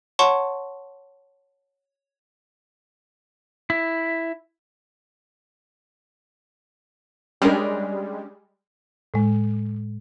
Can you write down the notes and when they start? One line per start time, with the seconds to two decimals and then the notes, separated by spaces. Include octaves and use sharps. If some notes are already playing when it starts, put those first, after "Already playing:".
0.19 C#5 F#5 A5 C6 C#6
3.70 E4
7.42 G3 G#3 C#4 D4 A#4
9.14 A2 G#3